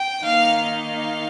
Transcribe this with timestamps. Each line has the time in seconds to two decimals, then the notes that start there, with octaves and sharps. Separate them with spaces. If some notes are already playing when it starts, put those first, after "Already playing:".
Already playing: G5
0.24 D#3 A#3 D#4 F5
0.60 F5